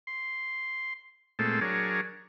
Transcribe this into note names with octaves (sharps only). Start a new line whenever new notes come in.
C6
A#2 G#3 A3 C4 A4
F#3 D4 G#4 A#4 C#5